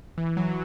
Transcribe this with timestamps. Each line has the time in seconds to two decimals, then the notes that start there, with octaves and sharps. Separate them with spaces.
0.18 E3
0.37 F#3